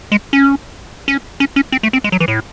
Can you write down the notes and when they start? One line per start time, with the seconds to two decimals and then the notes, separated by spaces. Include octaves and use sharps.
0.12 G#3
0.33 C#4
1.08 C#4
1.40 C#4
1.56 C#4
1.72 C4
1.83 A3
1.93 C4
2.04 G#3
2.12 F#3
2.20 E3
2.28 A2